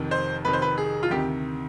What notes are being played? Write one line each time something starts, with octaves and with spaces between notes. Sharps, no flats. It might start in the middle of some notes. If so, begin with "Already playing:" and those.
Already playing: F1 F2 D#3
C5
F1 F2 D#3 B4
C5
B4
G#4
F4
D2 C3 D#3 G4